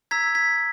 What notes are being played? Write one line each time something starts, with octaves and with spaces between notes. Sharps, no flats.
A#5 E6 G#6 B6
G#6 B6